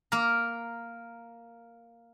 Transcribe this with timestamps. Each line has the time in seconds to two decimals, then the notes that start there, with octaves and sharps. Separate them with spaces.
0.12 A#3 A#4